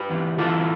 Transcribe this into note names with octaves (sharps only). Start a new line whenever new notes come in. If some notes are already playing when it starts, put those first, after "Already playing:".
Already playing: G4 B4
E2
E3 F4 A4